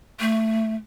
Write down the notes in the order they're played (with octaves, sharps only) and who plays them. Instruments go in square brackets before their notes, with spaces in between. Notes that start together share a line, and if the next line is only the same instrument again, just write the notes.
[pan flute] A3